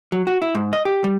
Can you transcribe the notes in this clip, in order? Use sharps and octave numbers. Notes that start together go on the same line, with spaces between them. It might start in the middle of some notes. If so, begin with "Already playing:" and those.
F#3
F#4
E4
G#2
D#5
G4
G3